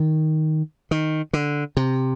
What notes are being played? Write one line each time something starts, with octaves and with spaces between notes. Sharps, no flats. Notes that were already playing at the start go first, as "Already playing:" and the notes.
Already playing: D#3
D#3
D3
C3